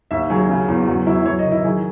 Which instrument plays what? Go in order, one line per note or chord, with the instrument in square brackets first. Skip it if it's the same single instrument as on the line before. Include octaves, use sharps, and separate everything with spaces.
[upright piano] D#2 E5
F#3 G#4
C#3
E2
F#3 F#4
F#3 E4
F#3 C#5
D#5
D#3
E4
F#3 G#4